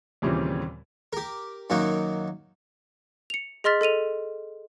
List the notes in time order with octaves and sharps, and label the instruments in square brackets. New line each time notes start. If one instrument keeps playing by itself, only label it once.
[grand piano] D#2 A#2 C#3 E3 G3 C4
[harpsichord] G4 A#4
F#2 D#3 F#3 A#3
[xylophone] C#7 F7
G#4 D#5 C6 F6 A6 B6
A4 D#5 D#7 F7